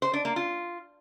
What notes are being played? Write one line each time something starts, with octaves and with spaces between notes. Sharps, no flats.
C5
D4
A#3
F4